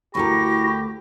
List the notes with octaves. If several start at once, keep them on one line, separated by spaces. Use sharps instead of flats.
D2 E4 F#4 G4 A4 A#4 A#6